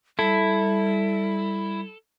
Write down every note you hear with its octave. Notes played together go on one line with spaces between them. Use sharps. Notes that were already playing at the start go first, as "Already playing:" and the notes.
G3 E4 A4